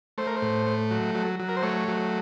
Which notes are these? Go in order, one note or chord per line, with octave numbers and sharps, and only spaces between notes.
A3 C5
A#4
C5
A2
A3
F#3
F#3
F#3
A#4
C5
A3 C#5
F#3